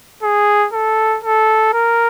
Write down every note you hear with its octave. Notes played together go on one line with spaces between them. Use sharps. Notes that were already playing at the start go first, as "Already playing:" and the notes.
G#4
A4
A4
A#4